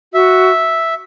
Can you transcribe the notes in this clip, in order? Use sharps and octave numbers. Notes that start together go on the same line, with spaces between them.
F#4 E5